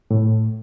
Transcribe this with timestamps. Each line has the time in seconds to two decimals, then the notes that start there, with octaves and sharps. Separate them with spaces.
0.11 A2